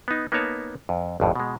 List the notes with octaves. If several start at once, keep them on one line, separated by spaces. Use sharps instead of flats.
B3 D#4
A#3 B3 D#4 B4 C#5 A5
F2
G#1 F2 A2
B2 G#3